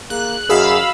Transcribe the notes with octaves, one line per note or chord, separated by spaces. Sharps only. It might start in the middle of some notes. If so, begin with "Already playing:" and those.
A#3 G#4 F#6
F#2 F#4 G#4 D#5 F5 B5 E6